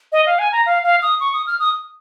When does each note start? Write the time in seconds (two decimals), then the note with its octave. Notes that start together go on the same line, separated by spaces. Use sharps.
0.12 D#5
0.26 F5
0.39 G#5
0.52 A#5
0.66 F5
0.83 F5
1.02 D#6
1.20 C#6
1.33 D#6
1.47 F6
1.60 D#6